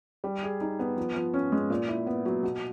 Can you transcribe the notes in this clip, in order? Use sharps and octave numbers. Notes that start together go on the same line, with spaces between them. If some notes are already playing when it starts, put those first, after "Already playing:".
G3
G#4
D#4
B3
F3
F3
C#4
G#3
A#2
E4
B3
F#3
B2